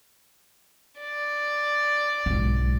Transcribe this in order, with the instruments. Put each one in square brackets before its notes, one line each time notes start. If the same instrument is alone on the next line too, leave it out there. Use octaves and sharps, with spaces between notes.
[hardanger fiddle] D5
[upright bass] B1 G#2